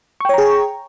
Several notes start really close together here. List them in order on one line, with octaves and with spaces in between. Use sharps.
C#6 G5 C#5 A#5 G#4